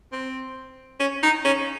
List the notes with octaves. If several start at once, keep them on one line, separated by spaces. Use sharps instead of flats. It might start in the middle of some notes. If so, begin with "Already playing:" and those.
C4
C#4
D#4
C#4